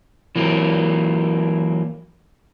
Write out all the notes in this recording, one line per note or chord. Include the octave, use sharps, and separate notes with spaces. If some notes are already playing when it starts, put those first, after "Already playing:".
E3 F#3 A#3